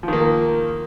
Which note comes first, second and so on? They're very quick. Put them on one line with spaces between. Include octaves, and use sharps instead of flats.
F3 D#3 A#3